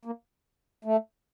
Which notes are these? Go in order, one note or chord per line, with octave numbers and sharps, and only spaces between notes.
A#3
A3